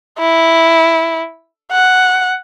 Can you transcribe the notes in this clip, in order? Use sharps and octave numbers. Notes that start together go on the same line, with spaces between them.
E4
F#5